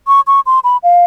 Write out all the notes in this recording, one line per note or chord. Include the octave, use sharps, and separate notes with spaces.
C#6
C#6
C6
B5
F5